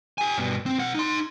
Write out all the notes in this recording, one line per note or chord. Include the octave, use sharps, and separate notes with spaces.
G4 G#5
G2 B2
C4
B1 F#5
D#4 C6